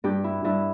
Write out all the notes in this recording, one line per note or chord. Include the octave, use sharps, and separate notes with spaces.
G2 G4
E4
G2 E4